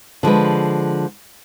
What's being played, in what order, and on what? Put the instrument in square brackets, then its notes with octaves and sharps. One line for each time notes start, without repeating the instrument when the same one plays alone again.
[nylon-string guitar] D3 F3 G#3 B4